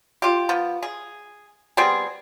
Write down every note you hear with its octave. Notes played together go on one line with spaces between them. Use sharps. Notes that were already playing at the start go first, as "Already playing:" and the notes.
F4 G4
F3 B3
G#4
G3 B3 C4 G#4